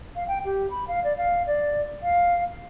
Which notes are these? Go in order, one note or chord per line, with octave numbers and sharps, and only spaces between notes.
F5
G5
G4
B5
F5
D5
F5
D5
F5